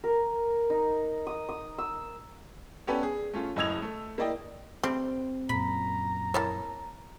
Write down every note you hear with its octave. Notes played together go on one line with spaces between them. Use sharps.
A#4
D#4
D#6
D#6
E6
B3 C#4 G4 A4 B4 D5
G#4
A3 C#4 F4
F#1 A2 D#5 E6 G#6 F7
A3
A#3 E4 D5 D#5 G5
G3 A3 C4
F#2 A#2 A#5 B5
A#3 E4 C#5 A5